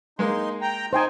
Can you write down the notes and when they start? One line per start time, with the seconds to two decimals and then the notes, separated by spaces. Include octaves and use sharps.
0.19 G#3 A#3 D#4 C6
0.62 G5 A#5
0.93 D#4 C5 G5 G#5